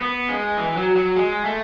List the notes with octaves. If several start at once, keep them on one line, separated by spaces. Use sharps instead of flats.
B3
G#3
E3
F#3
F#3
G#3
A3